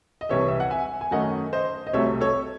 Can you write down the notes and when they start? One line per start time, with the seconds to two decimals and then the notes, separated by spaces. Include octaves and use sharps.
0.21 D#5
0.29 C2 C3 E3 C#5 E5
0.48 E5
0.60 F#5
0.70 E5 G#5
1.01 G#5
1.11 F#2 D#3 A3 C#4 D#5 F#5
1.53 C5 D#5
1.87 D#5
1.93 C2 C3 F#3 A3 C#5 E5
2.21 A4 C#5